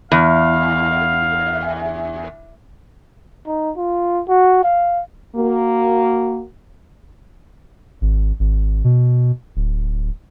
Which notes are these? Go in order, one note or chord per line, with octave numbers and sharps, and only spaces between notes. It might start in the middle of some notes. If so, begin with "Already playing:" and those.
E2 F5
D#4
F4
F#4
F5
A#3 F#4
G#1
G#1
B2
D1